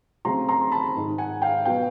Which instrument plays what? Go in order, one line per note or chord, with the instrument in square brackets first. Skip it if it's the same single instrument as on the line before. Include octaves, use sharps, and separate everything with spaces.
[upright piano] C#3 F#3 A3 C4 A#5 C6
A#5 C6
C6
A5 B5
G#2 D#3 G#3
F#5 G#5
F5 G5
B2 F#3 B3 F5 G5